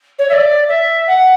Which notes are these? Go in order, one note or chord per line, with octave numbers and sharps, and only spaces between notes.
C#5
E5
D5
E5
F#5